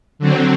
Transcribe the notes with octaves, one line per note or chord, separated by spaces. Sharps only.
D3 F#3 C4